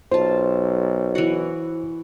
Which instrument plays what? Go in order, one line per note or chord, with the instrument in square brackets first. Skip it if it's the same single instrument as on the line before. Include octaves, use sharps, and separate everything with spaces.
[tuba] B1 [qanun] F4 A5 [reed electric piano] C5
[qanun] E3 F#4